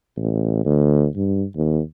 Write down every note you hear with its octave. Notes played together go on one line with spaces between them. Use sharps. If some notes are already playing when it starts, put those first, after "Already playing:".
A1
D2
G2
D#2